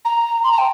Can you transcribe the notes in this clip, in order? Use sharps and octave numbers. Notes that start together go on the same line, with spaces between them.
A#5
C6
A#5
G5